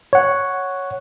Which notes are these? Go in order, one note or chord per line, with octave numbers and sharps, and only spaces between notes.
C#5 F#5